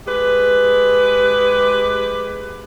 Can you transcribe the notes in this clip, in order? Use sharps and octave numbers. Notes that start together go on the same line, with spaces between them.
G#3 G4 B4